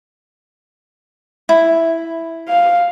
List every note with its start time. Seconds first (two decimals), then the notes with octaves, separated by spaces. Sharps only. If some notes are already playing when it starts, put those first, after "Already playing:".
1.49 E4
2.49 F5